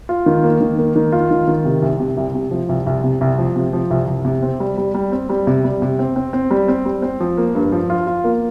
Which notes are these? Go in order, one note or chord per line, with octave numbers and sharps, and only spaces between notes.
F4
D#3
A#3
D#3
A#3
D#3
F4
D#3
D#3
C3
C2
C3
C2
C3
F3
C2
C2
C3
C2
F3
C3
F3
C2
C2
C3
C4
G3
G3
G3
C4
G3
C3
G3
C3
C4
C4
C4
G3
C4
G3
C4
F3
A#3
G2
F3
F4
F4
A#3